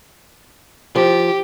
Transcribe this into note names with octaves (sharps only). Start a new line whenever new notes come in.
F3 G4